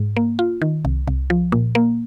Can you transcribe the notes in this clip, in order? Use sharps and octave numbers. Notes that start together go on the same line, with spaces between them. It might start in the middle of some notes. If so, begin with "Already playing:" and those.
Already playing: G#2
A#3
F4
D#3
C2
C2
F3
A#2
A#3